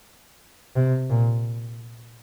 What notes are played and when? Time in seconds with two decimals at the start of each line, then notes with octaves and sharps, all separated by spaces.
0.76 C3
1.10 A#2